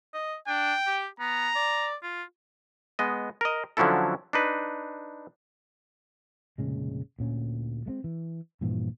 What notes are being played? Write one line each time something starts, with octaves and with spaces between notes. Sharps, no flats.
D#5
D4 G5
G4
B3 A#5
D5
F4
G#3 B3 D#5
A#4 D#5
D3 F3 F#3 C#4 E4 A4
D4 D#4 B4
F1 A#2 C#3 G#3
D2 A#2 C#4
G#3 A3 C4
E3
G2 A#2 E3 F3